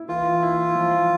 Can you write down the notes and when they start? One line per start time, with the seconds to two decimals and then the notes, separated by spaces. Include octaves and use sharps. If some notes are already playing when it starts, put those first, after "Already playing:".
Already playing: E4
0.09 E3 F4
0.43 E4
0.75 F3